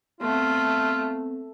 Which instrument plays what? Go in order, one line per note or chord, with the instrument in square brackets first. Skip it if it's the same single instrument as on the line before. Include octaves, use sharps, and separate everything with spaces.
[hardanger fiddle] A3 [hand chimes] B3 C4 [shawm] F4